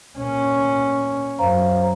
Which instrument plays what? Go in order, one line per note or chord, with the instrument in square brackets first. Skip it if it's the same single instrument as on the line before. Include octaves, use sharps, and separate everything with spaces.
[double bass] A#2 C#4
[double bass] F#2 [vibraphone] C5 F5 A#5